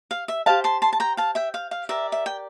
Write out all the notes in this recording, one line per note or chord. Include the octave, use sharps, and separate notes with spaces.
F5
E5
G4 C5 F5 A5
A5 C6
A5 C6
A5
G5 A#5
F5 A5
E5 G5
F5
F5
G4 A#4 D5 E5
E5
G5